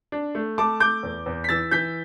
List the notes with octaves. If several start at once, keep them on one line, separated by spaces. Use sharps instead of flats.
D4
A3
A3 A5 D6
A3 D6 G6
E2
E2
B6
E3 E6 A6
E3 G6 B6